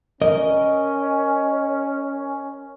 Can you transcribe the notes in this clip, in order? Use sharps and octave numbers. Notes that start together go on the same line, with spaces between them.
C#4 A#4 D#5